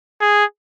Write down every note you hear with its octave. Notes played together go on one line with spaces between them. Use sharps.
G#4